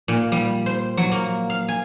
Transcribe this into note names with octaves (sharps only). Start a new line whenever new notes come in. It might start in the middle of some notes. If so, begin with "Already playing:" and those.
A#2
G3
C5
F#3
A#3
F5
G#5